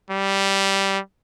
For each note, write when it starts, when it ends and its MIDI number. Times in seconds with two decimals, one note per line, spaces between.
0.10 0.99 55